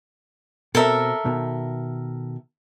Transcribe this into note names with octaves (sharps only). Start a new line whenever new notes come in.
B2 C4 A4 A#4 E5
B2 D#3